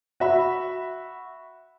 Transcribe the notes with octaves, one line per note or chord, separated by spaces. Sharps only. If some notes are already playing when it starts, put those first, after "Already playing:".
F#4 E5 B5